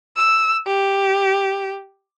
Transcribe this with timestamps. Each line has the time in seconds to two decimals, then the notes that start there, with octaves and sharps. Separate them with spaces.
0.17 E6
0.67 G4